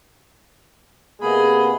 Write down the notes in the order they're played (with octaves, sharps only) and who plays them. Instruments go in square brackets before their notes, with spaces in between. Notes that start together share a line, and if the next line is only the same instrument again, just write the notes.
[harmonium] C3 A#3 B3 [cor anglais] G#4 [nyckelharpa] D#5 B5